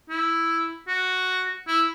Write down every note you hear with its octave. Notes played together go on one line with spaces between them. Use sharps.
E4
F#4
E4